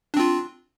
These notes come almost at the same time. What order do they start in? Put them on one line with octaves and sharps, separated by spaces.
D4 C4 F4